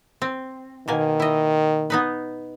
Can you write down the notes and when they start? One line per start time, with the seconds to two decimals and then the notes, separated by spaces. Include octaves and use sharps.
0.22 C4
0.88 B2 D#3 A#3 G#5
1.20 E4 D#5
1.90 B3 D#4 B4